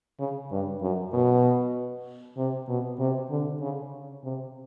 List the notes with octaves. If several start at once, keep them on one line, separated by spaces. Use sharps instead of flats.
C#3
G2
F#2
B2
C3
B2
C3
D3
C#3
C3